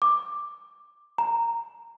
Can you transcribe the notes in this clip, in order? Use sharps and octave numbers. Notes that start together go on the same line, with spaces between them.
D6
A#5